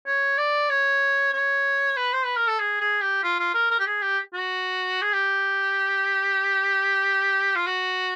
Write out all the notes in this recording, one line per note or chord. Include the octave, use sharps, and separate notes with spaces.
C#5
D5
C#5
C#5
B4
C5
B4
A#4
A4
G#4
G#4
G4
F4
F4
A#4
A#4
G4
G#4
G4
F#4
G#4
G4
F4
F#4